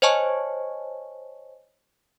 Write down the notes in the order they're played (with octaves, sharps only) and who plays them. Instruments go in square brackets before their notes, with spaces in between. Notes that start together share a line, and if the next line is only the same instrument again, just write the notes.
[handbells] C5 C#5 D#5 G#5 A5 C#6